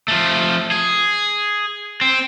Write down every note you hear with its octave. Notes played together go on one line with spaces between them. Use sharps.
F3 A3
G#4
C4